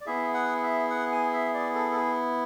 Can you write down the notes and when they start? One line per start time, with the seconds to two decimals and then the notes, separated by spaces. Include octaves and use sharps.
0.01 D5
0.06 B3 E4 G#4 E5
0.34 F#5
0.63 E5
0.90 F#5
1.12 G#5
1.33 E5
1.54 D5
1.75 A4
1.92 A4
1.96 G#4